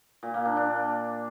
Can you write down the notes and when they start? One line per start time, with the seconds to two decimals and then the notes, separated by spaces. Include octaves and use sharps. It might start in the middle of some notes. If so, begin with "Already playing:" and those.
0.23 A#2
0.34 A#3
0.45 D4
0.57 D4